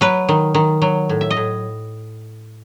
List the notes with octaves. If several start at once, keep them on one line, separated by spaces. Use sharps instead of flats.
F#3 B4
D#3
D#3
F#3
A2
E5
D#5
A2